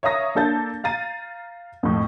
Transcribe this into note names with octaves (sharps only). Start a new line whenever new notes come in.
C#5 E5 F5 A#5 D#6 A#6
A#3 D4 A4 G6 A6
F5 A#5 A6 D#7
F2 A2